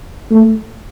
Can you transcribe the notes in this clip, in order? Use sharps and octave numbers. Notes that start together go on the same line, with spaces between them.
A3